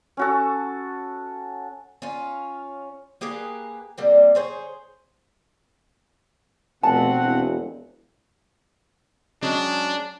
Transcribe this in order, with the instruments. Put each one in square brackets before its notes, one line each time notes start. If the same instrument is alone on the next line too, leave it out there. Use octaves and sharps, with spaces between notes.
[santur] C#4 F#4 A4
[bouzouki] C#4 F4
A#3 G4 G#4 B4
G3 A#3 C4
G#4 C5 C#5
[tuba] F1 [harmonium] B2 C4 F#5 [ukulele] A5
[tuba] E1
[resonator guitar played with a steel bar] F#3 G#3 C#4 [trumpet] D4